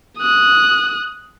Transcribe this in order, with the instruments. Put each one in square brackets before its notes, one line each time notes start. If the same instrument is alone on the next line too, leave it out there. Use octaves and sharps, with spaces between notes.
[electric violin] D#6 F#6